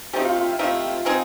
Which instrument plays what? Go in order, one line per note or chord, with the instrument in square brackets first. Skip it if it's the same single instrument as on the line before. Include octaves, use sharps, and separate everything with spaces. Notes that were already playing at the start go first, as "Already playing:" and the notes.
[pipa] F3 A3 C4 D#4 [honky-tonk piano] G4
[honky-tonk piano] F4
F4
E4
[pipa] F3 A3 C4 D#4 [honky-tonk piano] E4
[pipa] G#3 C4 D#4 G#4